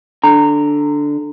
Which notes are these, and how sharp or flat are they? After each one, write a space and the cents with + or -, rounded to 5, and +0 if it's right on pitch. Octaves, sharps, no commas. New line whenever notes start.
D3 +0 A#5 -15